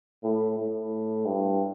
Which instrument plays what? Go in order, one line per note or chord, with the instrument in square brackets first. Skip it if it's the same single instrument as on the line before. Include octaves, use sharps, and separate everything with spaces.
[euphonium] A2
A2
G2